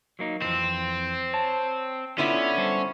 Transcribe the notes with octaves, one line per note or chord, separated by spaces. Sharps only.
F#3 A#3 D#4
F2 E3 C4
C#5 A5
D3 B3 C#4 E4 F4
G3 A4 C5